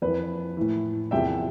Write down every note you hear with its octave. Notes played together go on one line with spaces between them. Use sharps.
F2 E3 B4
A2 E3
E2 C3 F3 E5 G5